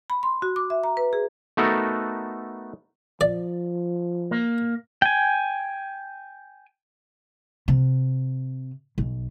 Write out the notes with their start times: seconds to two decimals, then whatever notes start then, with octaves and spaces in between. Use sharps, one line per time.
0.10 B5
0.23 C6
0.42 F#4
0.56 D6
0.70 E5
0.84 A#5
0.97 B4
1.13 G#4
1.57 A3 B3 D#4 F#4 A4 A#4
3.21 F3 D5
4.31 A#3
5.02 G5 G#5
7.68 C3
8.98 B1